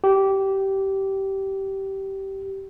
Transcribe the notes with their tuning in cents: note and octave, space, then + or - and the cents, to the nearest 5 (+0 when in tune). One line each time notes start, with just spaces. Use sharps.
G4 -20